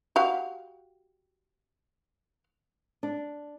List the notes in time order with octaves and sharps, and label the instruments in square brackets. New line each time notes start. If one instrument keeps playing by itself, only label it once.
[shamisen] F#4 G4 F5
[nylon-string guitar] D4